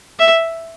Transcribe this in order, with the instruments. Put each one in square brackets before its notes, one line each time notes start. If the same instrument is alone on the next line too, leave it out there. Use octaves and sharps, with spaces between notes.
[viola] E5